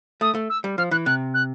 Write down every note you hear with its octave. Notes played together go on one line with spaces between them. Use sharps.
A3 D#6
A3
E6
G3
F3 F6
E3 F#6
C3 F#6
F#6